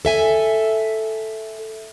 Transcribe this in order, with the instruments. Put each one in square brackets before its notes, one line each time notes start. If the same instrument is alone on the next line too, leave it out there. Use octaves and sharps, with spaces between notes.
[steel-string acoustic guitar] A4 E5 G#5